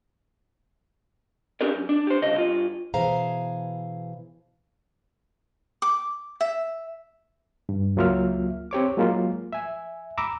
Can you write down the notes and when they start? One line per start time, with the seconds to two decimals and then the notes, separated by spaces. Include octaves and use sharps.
1.61 C#4 D4 G4 G#4 A#4 D5
1.75 F#2
1.89 D4
2.07 G4 C5
2.22 C2 C#3 D#5
2.38 G2 F4
2.94 B2 E3 G#4 C5 F5 A#5
5.82 D6
6.41 E5
7.69 G2
7.96 C#2 F#3 A#3 F4 E5 F6
8.71 C4 G4 C#5 D6
8.97 F#3 G#3 A#3 F4
9.53 E5 G#5
10.18 A#5 B5 D6 E6